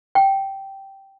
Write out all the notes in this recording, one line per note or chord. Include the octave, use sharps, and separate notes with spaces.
G5